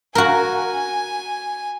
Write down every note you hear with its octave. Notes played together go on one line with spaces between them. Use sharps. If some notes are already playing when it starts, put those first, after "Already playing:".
F#4 A#4 G#5